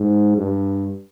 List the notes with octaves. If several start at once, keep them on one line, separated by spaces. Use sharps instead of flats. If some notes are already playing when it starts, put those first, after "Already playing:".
Already playing: G#2
G2